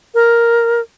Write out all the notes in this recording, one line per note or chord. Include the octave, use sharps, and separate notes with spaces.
A#4